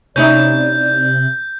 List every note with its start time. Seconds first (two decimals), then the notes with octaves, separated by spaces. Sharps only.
0.16 C3 C#4 D#4 E4 D5 G6